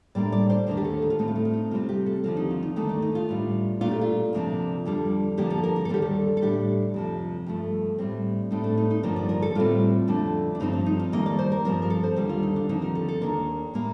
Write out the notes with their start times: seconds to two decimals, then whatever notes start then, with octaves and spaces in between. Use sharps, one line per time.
0.15 A2 G3 A#3 D4 D5
0.32 D5
0.50 C5
0.67 D#2 D3 A3 D4 A#4
0.77 G4
0.84 A4
1.02 D#4
1.10 F4
1.19 A2 A3 C4 D#4
1.28 F4
1.36 D#4
1.45 F4
1.53 D#4
1.71 C3 G3 C4 F4
1.89 G4
2.06 A4
2.24 D#2 D3 F3 C4 F4
2.37 D#4
2.51 F4
2.63 D#4
2.76 D#2 D#3 A3 D4 D#4
2.89 D4
3.02 D#4
3.15 F4
3.29 A2 G3 D4
3.81 A#2 A3 D4 F4
3.91 G4
4.01 F4
4.33 D2 C3 F3 A#3 D4
4.85 F2 D3 G3 D4
5.37 F2 D3 F3 A#3 G4
5.50 A4
5.64 A#4
5.76 A#4
5.85 A4
5.89 D#2 D3 G3 D4 G4
6.02 A4
6.37 A4
6.42 A2 G3 D4 G4
6.94 F2 C3 F3
7.46 G2 F3 A3
7.98 A2 G3 C4
8.51 A2 A3 C4 D#4
8.64 D4
8.77 D#4
8.91 D#4
9.03 G2 D3 F3 A#3 D4 A#4
9.16 D5
9.29 A#4
9.42 A4
9.55 A2 G3 C4 F4
10.08 F2 D3 A3 D4
10.55 D4
10.60 G2 F3 C4 D#4
10.73 D4
10.86 D#4
11.00 F4
11.12 F2 D#3 G3 A#3 D#5
11.26 D5
11.39 C5
11.52 A#4
11.65 G2 F3 C4 A#4
11.82 A#4
11.90 A4
12.04 C5
12.16 D#2 D3 G3
12.29 F4
12.43 D#4
12.56 D4
12.69 D#2 D3 F3 C4 D#4
12.82 A#4
12.95 A4
13.09 A4
13.21 D#2 D#3 A#3 D4 A#4
13.74 A2 G3 A#3